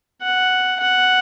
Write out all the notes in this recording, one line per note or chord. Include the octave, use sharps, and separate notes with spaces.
F#5
F#5